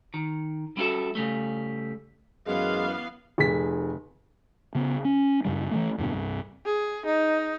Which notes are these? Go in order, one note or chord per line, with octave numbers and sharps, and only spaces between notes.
D#3
G3 C#4 E4 F#4 A4 E5
C#3 G3 A3
F#2 E3 G#3 B3 F5
F1 G#4 B6
C#3 B3
C#4
F#2 C#3 G3
E3 F3 A3
E2 G2 B2 D3
C2 G2
G#4
D#4